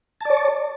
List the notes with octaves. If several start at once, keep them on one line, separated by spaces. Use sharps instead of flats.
C#5 D5 A5